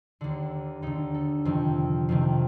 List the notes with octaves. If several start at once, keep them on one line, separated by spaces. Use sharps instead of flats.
D#2 D3 D4
D#2 D3 D#4
A4
F2 C3 D#3
F2 C3 D#3